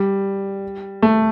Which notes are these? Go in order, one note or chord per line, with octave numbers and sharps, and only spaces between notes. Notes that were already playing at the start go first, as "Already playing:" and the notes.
Already playing: G3
A3